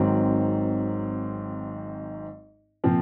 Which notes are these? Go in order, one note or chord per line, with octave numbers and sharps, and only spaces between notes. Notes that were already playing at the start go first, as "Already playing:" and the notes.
Already playing: G#1 G#2 D#3 F#3 C4
A#2 F3 C4